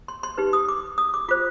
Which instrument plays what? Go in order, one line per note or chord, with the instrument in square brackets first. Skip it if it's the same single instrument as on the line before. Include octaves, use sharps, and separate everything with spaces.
[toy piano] C6
C6
D#4 G4 B4
D#6
D6
D#6
D6
F4 C5 D6